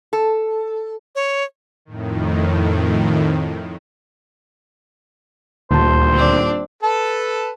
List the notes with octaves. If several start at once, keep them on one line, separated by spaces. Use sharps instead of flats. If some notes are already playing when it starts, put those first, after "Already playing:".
A4
C#5
F2 A2 D#3
D#1 D2 C5 A5
C4 D4
A4 B4 A5